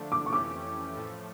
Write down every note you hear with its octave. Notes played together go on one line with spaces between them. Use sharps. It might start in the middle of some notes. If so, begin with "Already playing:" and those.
Already playing: D3 F3 A3 D4
D6
C#6
F2 E3 A3 C#4 G4 D6
A2 F3 A3